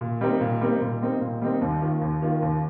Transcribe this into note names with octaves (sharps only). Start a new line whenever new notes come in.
A#2
G3 C4 D#4 A#4
A#2
G3 C4 D#4 A#4
A#2
G3 C4 D#4 A#4
A#2
G3 C4 D#4 A#4
D#2
D#3 A#3 F4
D#2
D#3 A#3 F4
D#2